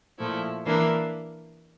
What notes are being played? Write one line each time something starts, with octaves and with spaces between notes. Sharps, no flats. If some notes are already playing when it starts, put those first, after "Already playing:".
A#2 F3 A3 E4
E3 A#3 D4